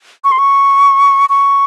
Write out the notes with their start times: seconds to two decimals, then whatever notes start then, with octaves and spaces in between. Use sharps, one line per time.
0.24 C#6
0.32 C6
0.39 C#6
1.29 C#6